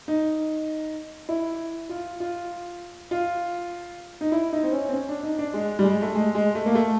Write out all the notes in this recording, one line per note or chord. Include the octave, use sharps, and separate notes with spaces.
D#4
E4
F4
F4
F4
D#4
E4
D#4
C4
C#4
C4
C#4
D4
D#4
D4
G#3
G3
G#3
A3
G#3
G#3
A3
A#3
A3